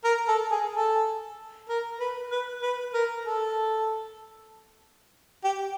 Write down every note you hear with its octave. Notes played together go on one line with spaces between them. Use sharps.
A#4
A4
G#4
A4
A#4
B4
B4
B4
A#4
A4
G4